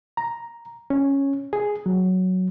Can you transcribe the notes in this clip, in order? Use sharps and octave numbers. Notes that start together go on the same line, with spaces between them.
A#5
C#4
G#4
F#3